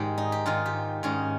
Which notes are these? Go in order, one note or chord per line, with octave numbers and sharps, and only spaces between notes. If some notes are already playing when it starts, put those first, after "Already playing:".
Already playing: G#2 D#3 G4
D#4
G4
G#2 D#3 F4
G4
G#2 D#3 C#4